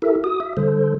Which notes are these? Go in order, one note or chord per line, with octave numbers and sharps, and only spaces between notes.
E4 G4 A4 A#4 E5
F#4 D#6
E5
D3 G3 A4 C5